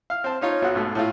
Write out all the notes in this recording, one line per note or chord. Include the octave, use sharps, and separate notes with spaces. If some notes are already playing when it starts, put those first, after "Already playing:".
F5 F6
C4 A5
C#4 D#4 F4 C#5
B1 F#3 F#5 F#6
G#2 B2 A3
A2 A3 F4